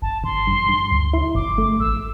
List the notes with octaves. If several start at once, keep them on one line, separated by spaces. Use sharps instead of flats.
G1 A5
G1 C6
G2
G2
D2
E4
G1 D6
A3
A1 E6